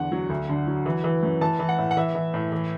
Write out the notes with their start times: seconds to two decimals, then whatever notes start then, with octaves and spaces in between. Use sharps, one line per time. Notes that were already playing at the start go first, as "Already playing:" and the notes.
Already playing: E2 D3 F#5
0.12 F#3
0.30 D2
0.49 D3
0.67 F#3
0.86 E3
1.04 E3
1.23 F#2
1.41 E3 A5
1.60 E3
1.69 F#5
1.78 A2
1.91 F#5
1.97 E3 E5
2.15 E3
2.34 A2
2.52 E3